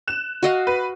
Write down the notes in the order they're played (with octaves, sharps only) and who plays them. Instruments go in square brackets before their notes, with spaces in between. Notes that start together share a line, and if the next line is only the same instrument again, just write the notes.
[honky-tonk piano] F#6 E7
[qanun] F#4 D#5 F5
[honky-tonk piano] B4